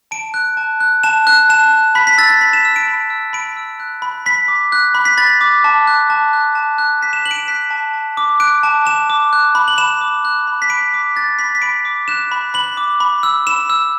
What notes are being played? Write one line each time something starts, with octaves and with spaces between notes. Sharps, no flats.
A5 D7
F#6
A5
F#6
A5 E7
F#6
A5 E7
F#6
B5 B6
B6
E6 A6
A6
B5 B6
E7
E6 E7
D7
B5
E6
B5 D7
E6
F#6
B5
B5 B6
D6
F#6
B5
B6
B5 A6
D6
A5
F#6
A5
F#6
A5
F#6
A5 B6
E7
F#6 F#7
D7
E7
F#6 B6
A5
A5
D6
F#6 D7
A5
A5 E7
D6
F#6
B5
F#7
B5 E7
D6
F#6
B5
B6
B5 D7
D6 B6
F#6 A6
B5 B6
B6
B5 D7
D6
F#6 E7
B5
B5 F#7
D6
B5
E6
B5 E7
E6